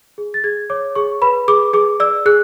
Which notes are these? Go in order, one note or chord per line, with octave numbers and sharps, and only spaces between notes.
G#4
A6
G#4 G#6
C#5 D6
G#4 C#6
B4 B5
G#4 D6
G#4 D6
D5 E6
G#4 F#6